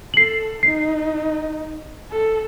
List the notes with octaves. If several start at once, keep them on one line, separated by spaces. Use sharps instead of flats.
A4 C7 F#7
D#4 C7
A4